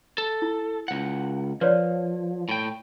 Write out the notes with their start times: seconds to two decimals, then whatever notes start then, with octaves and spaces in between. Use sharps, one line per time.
0.18 A4
0.42 E4
0.88 C#2 F#5
1.61 F3 B4 C#5 D5
2.49 A2 G5